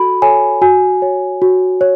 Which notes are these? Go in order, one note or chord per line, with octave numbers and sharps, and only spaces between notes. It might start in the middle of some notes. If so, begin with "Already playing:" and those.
Already playing: F#4 A4 B5
A4 C#5 G#5
F#4 G#5
C#5
F#4
C#5